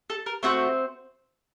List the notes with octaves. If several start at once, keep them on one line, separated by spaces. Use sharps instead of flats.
A4
A#4
A3 C4 F#4 C5